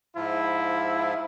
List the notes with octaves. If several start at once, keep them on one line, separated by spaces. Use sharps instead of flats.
G#2 F3 E4 F4